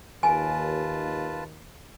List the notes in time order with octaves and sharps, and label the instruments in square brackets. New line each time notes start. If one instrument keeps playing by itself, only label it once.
[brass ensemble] D#2 [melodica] F4 B4 A5 [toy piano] G#5